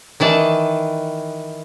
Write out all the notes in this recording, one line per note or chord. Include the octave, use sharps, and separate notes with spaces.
D#3 E3 D5 A5